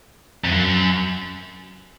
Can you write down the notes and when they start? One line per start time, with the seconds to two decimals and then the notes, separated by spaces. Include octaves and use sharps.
0.44 F2
0.52 F#2